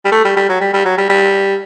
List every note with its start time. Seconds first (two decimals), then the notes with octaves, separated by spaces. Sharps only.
0.05 G3
0.12 A3
0.25 G3
0.36 G3
0.49 F#3
0.61 G3
0.73 G3
0.85 F#3
0.97 G3
1.09 G3